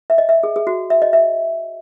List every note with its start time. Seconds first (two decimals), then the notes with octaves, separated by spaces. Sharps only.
0.10 E5
0.18 D#5
0.29 E5
0.43 G#4
0.56 G#4
0.67 F#4
0.90 E5
1.02 D#5
1.13 E5